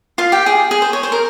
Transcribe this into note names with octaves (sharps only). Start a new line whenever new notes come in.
F4 F5
G4 G5
G#4
G#4
C5
C#5
C5
A#4